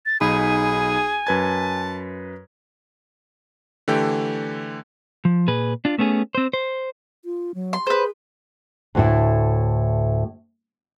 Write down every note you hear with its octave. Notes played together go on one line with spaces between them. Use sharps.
A6
B1 D#4 G#4 G#5 B5
F#2 B4 A5 G#6
D3 E3 A3 G4 G5
F3
A#2 G#4 B4
D4 F4
A3 B3 C#4 G#4
C4 C5
C5
F4
F#3
C6
G#4 B4 C5
D2 A2 E4